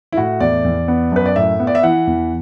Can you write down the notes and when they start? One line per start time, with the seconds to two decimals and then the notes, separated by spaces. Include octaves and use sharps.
0.12 E4
0.17 A2 F#4
0.40 E2 D5
0.65 E2
0.88 B3
1.12 F#2 B4
1.26 D5
1.36 A2 E5
1.60 B3
1.67 D5
1.75 E5
1.83 E3 F#5
2.07 E2